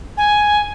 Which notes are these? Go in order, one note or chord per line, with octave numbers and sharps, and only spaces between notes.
G#5